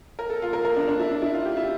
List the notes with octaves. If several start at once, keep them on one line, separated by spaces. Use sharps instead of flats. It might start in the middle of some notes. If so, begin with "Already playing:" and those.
A#4
A4
F4
A#4
A#4
D4
D4
E4
D4
E4
F4
G4
E4